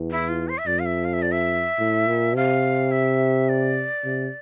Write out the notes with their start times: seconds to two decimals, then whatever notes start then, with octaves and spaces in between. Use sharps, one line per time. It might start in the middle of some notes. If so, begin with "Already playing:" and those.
Already playing: E2
0.11 E4
0.29 F4
0.48 C5
0.58 E5
0.66 F2 D5
0.79 F5
0.85 E5
1.05 F5
1.13 E5
1.22 D5
1.32 E5
1.79 A2
2.07 A#2
2.36 C3 F5
2.91 E5
3.49 D5
4.05 C3